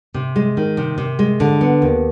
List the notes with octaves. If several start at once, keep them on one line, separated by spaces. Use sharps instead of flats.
C3
G#3
D#3
C3
C3
G#3
D3
B3
D#2